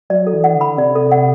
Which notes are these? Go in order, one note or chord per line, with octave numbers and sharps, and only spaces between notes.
F#3 D5
A4
E3
F#5
D3
B5
C3 D5
A4
F#5